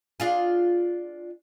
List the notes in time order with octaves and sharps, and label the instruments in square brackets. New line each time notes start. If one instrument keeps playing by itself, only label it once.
[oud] D4 F4 G#4